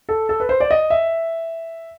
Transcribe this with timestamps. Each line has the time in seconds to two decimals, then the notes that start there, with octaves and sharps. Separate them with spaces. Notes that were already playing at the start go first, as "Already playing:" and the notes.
0.09 A4
0.29 A4
0.40 B4
0.49 C5
0.60 D5
0.71 D#5
0.90 E5